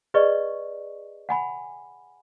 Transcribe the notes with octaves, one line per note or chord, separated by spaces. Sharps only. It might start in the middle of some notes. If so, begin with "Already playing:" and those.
G#4 B4 D5 D#5 C#6
F#5 G#5 B5